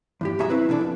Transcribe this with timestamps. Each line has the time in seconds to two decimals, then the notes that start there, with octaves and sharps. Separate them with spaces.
0.21 E2 G2 G4
0.39 B1 G2 F#4 G#4 E5 A#5
0.50 C4 E4 B4
0.69 B2 E3 D4 A4
0.81 F2